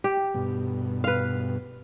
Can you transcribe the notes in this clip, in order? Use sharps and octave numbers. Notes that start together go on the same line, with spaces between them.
G4
G2 B2
B4 F5